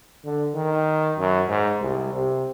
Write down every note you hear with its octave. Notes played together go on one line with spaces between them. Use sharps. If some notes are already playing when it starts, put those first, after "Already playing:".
D3
D#3
F#2
G#2
C2
C3